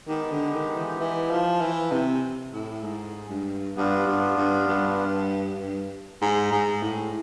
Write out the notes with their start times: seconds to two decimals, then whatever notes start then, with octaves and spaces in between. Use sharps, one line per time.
0.08 D#3 G#3 B3 D#4 G4
0.31 D3
0.54 D#3
0.77 E3
1.00 E3
1.30 F3
1.61 E3
1.92 C3
2.53 A2
2.84 G#2
3.29 G2
3.76 G2 B3 D4 F4
4.06 G2
4.37 G2
4.68 G2
5.60 G2
6.22 G#2
6.52 G#2
6.82 A2